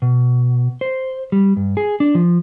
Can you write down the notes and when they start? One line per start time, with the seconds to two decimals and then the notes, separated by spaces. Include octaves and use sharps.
0.02 B2
0.81 C5
1.32 G3
1.57 G2
1.77 G#4
2.00 D4
2.15 F3